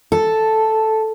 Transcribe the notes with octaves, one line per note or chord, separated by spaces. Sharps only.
A4